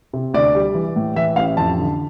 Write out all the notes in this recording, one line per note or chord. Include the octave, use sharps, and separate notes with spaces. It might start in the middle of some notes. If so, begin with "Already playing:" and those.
C3
D2 D5
G3
E3
A2
E3 E5
A1 F5
F2 A5
D3